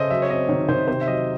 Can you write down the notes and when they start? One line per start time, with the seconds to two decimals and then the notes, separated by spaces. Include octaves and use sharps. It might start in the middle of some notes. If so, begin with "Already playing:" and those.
Already playing: C#3 A4 C5 D#5 E5
0.10 F#3 E5
0.22 C#5
0.30 C4 D#5
0.49 D#3 C#5
0.68 D#3 C5
0.88 C3 C5
1.01 E5
1.07 F#3 D#5